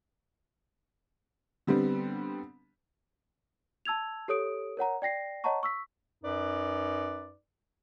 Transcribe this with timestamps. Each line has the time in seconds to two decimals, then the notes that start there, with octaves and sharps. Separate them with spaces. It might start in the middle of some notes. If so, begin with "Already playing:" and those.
1.67 D3 G3 B3 C4
3.85 A5 E6 G#6 F7
4.28 G4 A4 C#5 D#6 D7
4.77 A#4 C#5 F#5 A#5
5.02 D5 G5 A#6 C7
5.44 C#5 D#5 F#5 A5 A#5 C#6
5.63 C#6 E6 B6
6.24 F#2 D#4 B4 D5